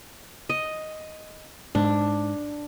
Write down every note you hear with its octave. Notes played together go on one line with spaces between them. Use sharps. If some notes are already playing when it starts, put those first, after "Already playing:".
D#5
G#2 D4